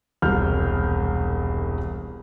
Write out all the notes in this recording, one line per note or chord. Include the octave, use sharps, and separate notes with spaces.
E1 C2 F6 G6